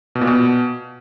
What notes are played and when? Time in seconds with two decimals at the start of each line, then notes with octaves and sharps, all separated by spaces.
0.15 B2
0.21 A#2
0.27 B2